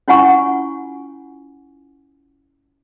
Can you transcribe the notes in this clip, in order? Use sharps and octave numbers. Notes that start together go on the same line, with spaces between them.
C#4 E4 F4 F#5 G#5 C#6